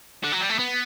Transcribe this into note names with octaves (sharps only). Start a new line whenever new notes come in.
D3
F#3
G3
A3
B3